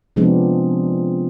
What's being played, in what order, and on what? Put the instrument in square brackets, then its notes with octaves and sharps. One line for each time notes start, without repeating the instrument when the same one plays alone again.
[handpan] C3 F3 G#3 B3 C4 D4